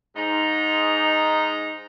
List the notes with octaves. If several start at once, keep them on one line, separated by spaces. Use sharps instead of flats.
G#2 D#4 A#5